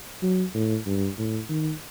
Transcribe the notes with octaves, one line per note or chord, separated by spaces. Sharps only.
F#3
A2
G2
A2
D#3